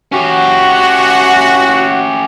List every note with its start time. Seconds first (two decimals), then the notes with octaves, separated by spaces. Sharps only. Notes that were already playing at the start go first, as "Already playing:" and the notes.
0.12 C#4 F#4 G4